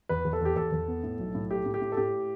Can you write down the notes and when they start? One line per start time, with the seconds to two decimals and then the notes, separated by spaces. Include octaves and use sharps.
0.09 E2 B4
0.25 E2
0.33 A4
0.41 E2 G4
0.56 E2 A4
0.72 E2
0.88 B3
1.03 A2
1.19 B1
1.35 A2
1.50 A3 G4
1.66 A2
1.74 G4
1.82 A2
1.92 A4
1.97 A2 G4